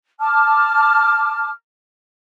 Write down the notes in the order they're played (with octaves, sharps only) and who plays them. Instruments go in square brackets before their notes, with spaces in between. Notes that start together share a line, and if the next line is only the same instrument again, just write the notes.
[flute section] A5 D6 F6